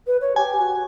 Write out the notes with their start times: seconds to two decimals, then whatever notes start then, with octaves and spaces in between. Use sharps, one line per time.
0.07 B4
0.21 C#5
0.36 G4 G#5
0.58 F#4